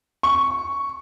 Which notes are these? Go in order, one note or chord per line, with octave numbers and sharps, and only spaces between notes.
C#6